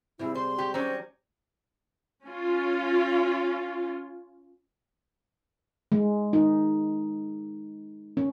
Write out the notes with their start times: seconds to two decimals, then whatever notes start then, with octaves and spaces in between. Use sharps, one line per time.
0.19 C3 G3 G#3 E4
0.35 C5 C6
0.58 G4 C#5
0.74 F#3 C#4 D#4 G4 C5 D5
2.24 C#4 F4
5.92 G#3
6.33 D#4
8.17 C#4